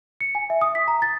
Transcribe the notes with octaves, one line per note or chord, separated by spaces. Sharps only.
C#7
G#5
E5
D#6
B6
A#5
A6